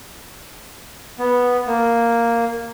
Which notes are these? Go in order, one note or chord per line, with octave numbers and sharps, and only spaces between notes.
B3
A#3